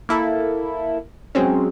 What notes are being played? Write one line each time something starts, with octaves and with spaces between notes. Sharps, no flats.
A#3 E4 A4
F#3 G#3 C4 C#4